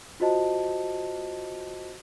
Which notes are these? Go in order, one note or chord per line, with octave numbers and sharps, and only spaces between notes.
F4 F#4 C5 D#5 A5